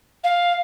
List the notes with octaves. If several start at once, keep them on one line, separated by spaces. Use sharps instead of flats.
F5